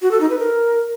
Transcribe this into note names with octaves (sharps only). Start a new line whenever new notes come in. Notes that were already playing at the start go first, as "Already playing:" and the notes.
F#4
A4
D#4
B4
A#4